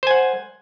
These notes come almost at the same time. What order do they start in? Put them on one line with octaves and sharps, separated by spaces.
C5 G#5 F#5